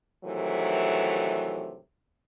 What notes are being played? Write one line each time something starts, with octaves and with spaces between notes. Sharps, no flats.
G2 C3 D#3 E3 F#3 A3